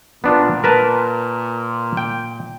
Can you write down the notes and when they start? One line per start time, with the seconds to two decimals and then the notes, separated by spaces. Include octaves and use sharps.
0.24 A#2 B3 D4 F4
0.64 A#4 B4 A5
1.97 G5